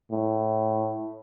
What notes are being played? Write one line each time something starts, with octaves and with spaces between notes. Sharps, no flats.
A2